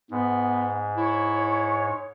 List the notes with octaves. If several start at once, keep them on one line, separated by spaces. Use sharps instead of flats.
G#2 B3
E4 C#5